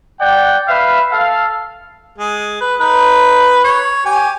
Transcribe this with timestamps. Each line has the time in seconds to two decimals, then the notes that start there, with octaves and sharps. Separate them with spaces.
0.20 D5 F#5 G5
0.67 B4 E5 F5
1.11 A4 F5
2.18 G#3
2.61 B4
2.80 D#4 B4
3.64 C#5
4.05 G4 G#5